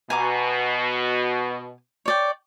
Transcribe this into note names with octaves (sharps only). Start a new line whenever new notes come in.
B2 G#5 A#5 D6
C#5 D5 G5